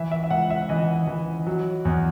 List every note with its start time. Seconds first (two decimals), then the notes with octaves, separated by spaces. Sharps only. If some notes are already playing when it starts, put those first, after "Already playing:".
Already playing: E3 E5
0.11 E5
0.24 E5
0.30 C#2 F#5
0.50 E5
0.69 E3 D#5
1.07 E3
1.47 F#3
1.85 E2